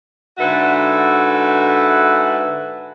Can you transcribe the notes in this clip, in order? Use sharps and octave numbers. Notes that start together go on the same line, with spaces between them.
G#2 D3 F#4 A4 B4 E5